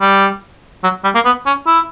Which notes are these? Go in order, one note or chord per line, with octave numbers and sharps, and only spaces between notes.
G3
F#3
G3
A#3
B3
C#4
E4